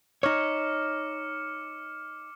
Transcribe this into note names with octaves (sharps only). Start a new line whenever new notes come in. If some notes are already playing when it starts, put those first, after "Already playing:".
D#4 C#5 D6 F6 C#7